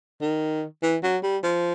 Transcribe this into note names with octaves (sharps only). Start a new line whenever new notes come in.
D#3
E3
F#3
G3
F3